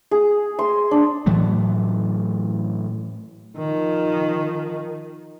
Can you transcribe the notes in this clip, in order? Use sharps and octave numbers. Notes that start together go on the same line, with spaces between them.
G#4
C6
D4
A2 E3 F#3 A3
D#3 F3